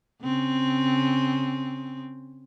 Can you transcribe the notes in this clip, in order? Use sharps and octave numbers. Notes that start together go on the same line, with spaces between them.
C#3 C4